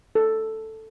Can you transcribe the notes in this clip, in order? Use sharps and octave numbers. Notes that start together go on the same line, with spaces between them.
A4